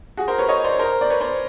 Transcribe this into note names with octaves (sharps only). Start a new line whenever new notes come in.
F#4 G#4
A#4 C5
B4 C#5
C#5 D#5
C5 D5
A#4 C5
D5
B4 C#5
C5 D5